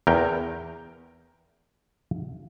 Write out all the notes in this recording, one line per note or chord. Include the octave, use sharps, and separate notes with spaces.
E2 A#4 G5